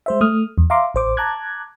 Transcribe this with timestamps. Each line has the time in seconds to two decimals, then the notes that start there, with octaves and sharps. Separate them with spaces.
0.06 G#3 C5 E5
0.21 A3 D#6 F6
0.58 E2
0.70 E5 F5 A#5 C6 D6
0.94 A1 C5 D6
1.17 A5 A#5 D6 F#6 G#6